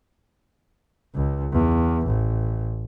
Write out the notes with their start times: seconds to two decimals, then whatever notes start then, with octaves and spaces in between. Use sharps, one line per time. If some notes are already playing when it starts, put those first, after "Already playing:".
1.15 C#2
1.52 E2
2.07 A1